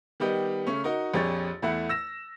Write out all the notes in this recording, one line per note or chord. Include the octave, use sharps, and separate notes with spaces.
D#3 G3 B3 G4 D#5
C#3 A3 C#4 C#6
D#4 F#4 A#4 D#5
A#1 F2 G4 G#4 C#5 A6
E2 A3 E4 F#5
E6 A#6 E7